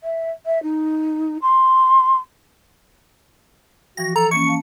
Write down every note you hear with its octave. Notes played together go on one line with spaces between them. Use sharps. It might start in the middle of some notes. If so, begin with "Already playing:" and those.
E5
E5
D#4
C6
E3 F3 F#4 G5 A#6
A4 A#5
E3 A#3 C#4 C#6 C#7
F5 A5